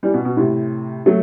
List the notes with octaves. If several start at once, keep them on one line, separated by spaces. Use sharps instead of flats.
E3 G3
B2
B2
A2 C3
F#3 A3